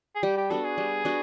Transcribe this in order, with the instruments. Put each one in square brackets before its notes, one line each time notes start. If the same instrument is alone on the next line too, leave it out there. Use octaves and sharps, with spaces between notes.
[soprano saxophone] G#4
[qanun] G3 [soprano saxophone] G4
[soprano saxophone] G4
[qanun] B3 D4 F#4 [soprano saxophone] A4
[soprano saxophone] G#4
[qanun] G3
B3 D4 F#4